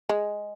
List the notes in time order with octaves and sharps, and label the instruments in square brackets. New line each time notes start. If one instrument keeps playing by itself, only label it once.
[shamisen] G#3